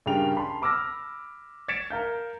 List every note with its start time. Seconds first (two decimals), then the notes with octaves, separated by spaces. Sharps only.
0.06 G2 C#3 G3 A#4 G5 F7
0.36 A5 B5 C6
0.62 B5 D6 E6 F6 A#6
1.68 G#6 A6 B6 C#7 D7 E7
1.90 A#4 F5 G6